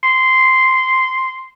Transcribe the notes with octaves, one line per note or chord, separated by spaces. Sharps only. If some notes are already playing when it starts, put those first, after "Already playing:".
C6